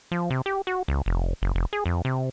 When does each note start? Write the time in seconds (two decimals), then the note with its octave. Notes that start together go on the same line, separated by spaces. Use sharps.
0.12 F3
0.30 C3
0.46 G4
0.67 F#4
0.88 C#2
1.06 F1
1.42 F#1
1.55 F1
1.73 G#4
1.86 F2
2.05 C3